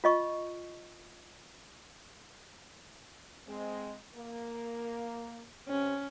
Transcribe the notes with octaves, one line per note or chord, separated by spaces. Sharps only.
F4 D#5 C#6
G#3 C4
A#3
C3 C4 C#4